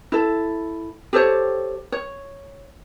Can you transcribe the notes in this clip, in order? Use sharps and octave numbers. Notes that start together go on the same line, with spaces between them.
E4 A4
G4 A4 C5 C#5
C#5